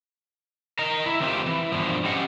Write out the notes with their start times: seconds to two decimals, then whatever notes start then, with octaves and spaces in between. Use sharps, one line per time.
0.79 A#4 D#5 A#5
1.06 E4
1.20 D#3 F#3 A3 C4 F4 G4
1.46 E3
1.72 G2 B2 F3
2.04 C#4 G4 D#5 F#5